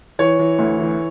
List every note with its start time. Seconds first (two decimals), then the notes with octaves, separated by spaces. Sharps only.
0.19 E3 C#5
0.39 E3
0.59 D2
0.79 E3